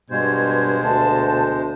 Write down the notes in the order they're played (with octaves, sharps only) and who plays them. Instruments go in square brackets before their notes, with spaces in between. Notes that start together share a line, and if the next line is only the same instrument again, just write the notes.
[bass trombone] G2 [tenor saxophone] B2 [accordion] G#3 C5 [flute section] G#6
[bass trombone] D2 [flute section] A5